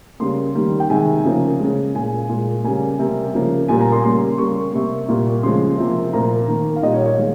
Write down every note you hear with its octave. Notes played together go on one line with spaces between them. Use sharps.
C#3 G3 A#3 C6
D#3 G3 A#3
G5
C3 D#3 G#3 G#5
C#3 F3 A#3
C#3 G#3
A#2 G#3 G#5
A#2 G#3
C#3 G3 A#3 G#5
C3 G3 A#3
C#3 F3 A#3
A#2 G3 A#3 G#5
A#5
C6
C#3 G3 A#3 C6
C#3 G3 A#3 C#6
C3 G3 A#3
A#2 G3 A#3
C#3 F3 G#3 C6
C3 F3 A#3
A#2 F3 A#3 A#5
D#3 A#3
F5
A#2 G3 A#3 D#5
C#5
C#5
D#3 G#3 F5